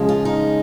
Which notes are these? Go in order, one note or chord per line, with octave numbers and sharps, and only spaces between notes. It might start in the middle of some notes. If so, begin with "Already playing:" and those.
Already playing: C#3 F3 G#3 C#4
F4
D#4